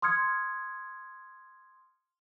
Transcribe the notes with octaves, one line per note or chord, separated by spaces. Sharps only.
C6 D#6 F6 G#6 C#7